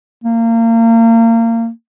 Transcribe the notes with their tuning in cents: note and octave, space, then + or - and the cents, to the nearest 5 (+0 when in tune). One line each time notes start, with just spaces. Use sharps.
A#3 -30